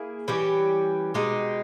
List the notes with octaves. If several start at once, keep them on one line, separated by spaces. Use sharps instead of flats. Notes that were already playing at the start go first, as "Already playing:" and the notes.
Already playing: A#3 E4 G#4
E3 G3 C#4 G4
B2 G#3 D#4 G4